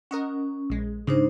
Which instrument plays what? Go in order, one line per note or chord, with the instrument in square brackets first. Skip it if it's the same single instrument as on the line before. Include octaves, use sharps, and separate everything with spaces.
[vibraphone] C#4 [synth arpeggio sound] A#4 D#5 F#5
[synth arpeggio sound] A#1 G#3
[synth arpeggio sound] G#2 C#3 G#3 [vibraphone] D4 D#4 C5